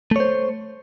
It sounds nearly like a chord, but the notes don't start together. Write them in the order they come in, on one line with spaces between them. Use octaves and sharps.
A3 C#5 C5